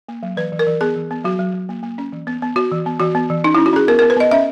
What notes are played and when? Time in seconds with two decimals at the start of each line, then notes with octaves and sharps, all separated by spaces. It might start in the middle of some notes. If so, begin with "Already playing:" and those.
0.09 A#3
0.23 F#3
0.37 E3 B4
0.52 E3
0.59 A#4
0.67 E3
0.81 B3 G#4
0.96 E3
1.11 B3
1.24 F#3 F#4
1.39 F#3
1.54 F#3
1.69 A#3
1.83 A#3
1.98 C#4
2.13 E3
2.27 B3
2.42 B3
2.56 B3 F#4
2.71 E3
2.86 B3
3.00 E3 F#4
3.15 B3
3.30 E3
3.44 C#4 D#4
3.55 E4
3.58 C#4
3.66 F#4
3.73 C#4 G#4
3.88 B3 A#4
3.99 A#4
4.02 B3
4.10 B4
4.17 B3 D#5
4.31 C#4 E5